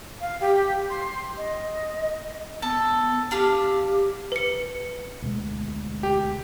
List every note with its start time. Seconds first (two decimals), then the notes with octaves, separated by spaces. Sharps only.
0.21 F5
0.41 G4
0.89 C6
1.37 D#5
2.62 B3 A4
3.31 D4 F4 G4 F5
4.32 B4 C#7
5.22 D2 B2 G#3
6.03 G4